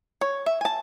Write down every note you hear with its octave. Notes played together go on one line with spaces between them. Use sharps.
C#5
E5
G#5 A5